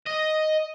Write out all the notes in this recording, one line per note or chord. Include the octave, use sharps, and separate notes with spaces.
D#5